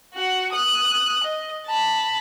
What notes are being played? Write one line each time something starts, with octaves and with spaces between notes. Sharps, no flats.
F#4 F#5
D#6 F#6
D#5
A5 B5